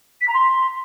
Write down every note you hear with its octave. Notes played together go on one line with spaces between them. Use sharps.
B6
A#5
C6